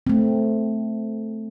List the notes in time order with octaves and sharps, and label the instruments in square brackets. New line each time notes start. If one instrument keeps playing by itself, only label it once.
[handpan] A3 C4